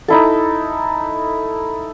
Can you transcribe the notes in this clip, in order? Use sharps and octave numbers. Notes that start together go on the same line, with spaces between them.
D#4 E4 A4